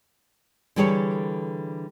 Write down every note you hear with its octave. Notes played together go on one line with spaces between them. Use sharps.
D3 E3 G3 G#4 A4 C#5